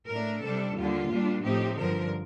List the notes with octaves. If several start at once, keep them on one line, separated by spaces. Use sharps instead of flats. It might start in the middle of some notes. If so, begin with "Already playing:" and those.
A2 A3 D4 A#4
C3 G3 D4 A4
D#2 D3 G3 F4
A#2 G3 D4
A2 F3 A3 C4 D#4 G4
G2 D3 F3 A#4